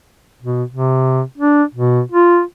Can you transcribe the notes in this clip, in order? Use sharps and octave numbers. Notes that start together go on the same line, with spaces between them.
B2
C3
D4
B2
F4